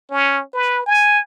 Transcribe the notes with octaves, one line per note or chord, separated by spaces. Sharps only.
C#4
B4
G#5